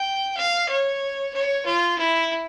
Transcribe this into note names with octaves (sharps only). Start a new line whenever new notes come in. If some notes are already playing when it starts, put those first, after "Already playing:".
Already playing: G5
F5
C#5
C#5
F4
E4